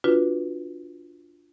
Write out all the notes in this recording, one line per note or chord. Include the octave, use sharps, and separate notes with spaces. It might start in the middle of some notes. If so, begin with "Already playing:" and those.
D4 F4 F#4 B4